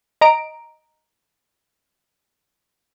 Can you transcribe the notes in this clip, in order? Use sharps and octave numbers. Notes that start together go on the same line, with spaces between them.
D#5 A#5 D7